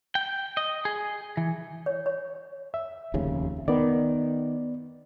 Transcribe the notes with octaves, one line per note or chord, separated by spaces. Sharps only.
G5
D#5
G#4
E3
C#5
C#5
E5
F1 D#2 C#3
D#3 B3 D5